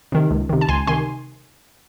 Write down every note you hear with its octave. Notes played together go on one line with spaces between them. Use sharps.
C3 D#3
C#2
C3 D#3
A5
C#2 G#5 C6
C3 D#3 G#5 C6